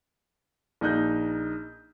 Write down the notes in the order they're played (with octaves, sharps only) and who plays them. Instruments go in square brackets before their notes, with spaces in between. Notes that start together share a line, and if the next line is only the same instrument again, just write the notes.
[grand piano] A#1 D#4 F#6 G6